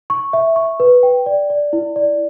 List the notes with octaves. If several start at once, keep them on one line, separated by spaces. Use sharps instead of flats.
C#6
E5
C#6
B4
G5
D5
D5
E4
D5